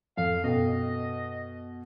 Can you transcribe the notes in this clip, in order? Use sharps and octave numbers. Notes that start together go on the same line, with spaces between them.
F2 A4 F5
F#2 B2 A4 D#5 G5